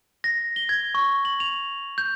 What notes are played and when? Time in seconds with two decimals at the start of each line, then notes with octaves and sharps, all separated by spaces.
0.24 A#6
0.56 G7
0.69 G#6
0.95 C#6
1.25 F#7
1.40 F7
1.98 G6